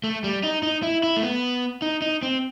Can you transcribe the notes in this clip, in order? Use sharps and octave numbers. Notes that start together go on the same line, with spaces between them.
A3
G3
D#4
D#4
E4
E4
A3
B3
D#4
D#4
C4